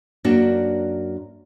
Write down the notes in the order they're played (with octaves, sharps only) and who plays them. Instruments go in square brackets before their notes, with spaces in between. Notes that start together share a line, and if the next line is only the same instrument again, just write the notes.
[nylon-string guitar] F#2 A#3 D4 F#4